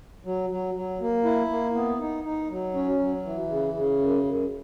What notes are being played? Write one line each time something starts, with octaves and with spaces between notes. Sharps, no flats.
F#3
F#3
F#3
A#3
E4
A#3
B3
D#4
D#4
F#3
C#4
F#3
E3
C#3
C#3
F#2
F#2